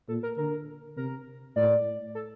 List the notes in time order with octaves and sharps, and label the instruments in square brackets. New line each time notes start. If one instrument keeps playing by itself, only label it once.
[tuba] A#2 [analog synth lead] A4
[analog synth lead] A#4
[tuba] D3 [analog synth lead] A#4
[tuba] C3 [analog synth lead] A#4
[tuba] A2 [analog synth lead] D5
[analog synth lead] A4